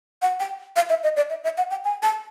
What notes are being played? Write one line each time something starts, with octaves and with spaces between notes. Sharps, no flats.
F#5
G5
F5
E5
D#5
D5
E5
E5
F#5
G5
G#5
A5